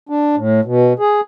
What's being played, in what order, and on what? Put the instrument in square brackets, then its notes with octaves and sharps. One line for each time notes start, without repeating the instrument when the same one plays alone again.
[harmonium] D4
A2
B2
G#4